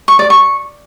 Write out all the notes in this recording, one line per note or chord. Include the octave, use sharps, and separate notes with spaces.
C#6
D5
C#6